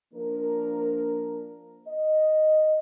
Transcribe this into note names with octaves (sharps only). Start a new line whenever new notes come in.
F3 A#3 D4 A#4
D#5